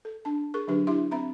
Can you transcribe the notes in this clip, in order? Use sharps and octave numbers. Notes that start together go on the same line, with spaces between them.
A4
D4 A5
G#4 A#4 C#6
D3 F#3 D4 G4 B4
D4 E4 G4 E5 C6
C4 E5 A#5 B5